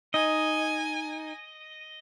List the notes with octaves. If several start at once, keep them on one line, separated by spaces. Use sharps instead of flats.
D#4 D#5 G#5